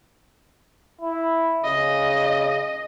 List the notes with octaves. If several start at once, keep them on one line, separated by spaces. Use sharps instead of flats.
E4
C#3 D#5